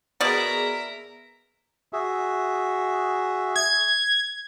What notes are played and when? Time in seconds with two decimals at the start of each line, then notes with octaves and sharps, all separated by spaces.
0.21 B2 B3 G#4 A#4 D5 E5
1.93 F#4 G#4 E5
3.56 G#6